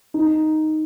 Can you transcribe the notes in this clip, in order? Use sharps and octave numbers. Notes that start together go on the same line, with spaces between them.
D#4